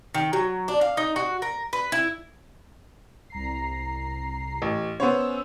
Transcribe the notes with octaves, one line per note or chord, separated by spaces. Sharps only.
D#3
F#3
D4
F5
D#4
F#4
A#4
B4
E4
C2 A#5 C7
A1
B3 C#4 C5 C#5 E6